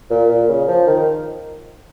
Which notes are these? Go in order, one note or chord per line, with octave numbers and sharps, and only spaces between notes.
A#2
A#2
C#3
F3
D#3